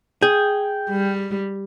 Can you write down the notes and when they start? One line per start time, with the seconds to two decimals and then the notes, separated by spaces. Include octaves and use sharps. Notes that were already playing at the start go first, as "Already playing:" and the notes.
0.22 G#4 G5
0.90 G3